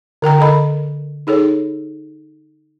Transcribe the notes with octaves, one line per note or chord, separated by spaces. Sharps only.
D3 A#4 G5 A#5
D3 A4 D#5 B5
D#4 G#4 A4 C#5